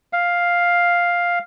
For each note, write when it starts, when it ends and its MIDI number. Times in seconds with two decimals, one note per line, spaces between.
0.13 1.39 77